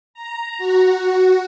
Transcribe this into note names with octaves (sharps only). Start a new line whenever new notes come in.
A#5
F#4
F#4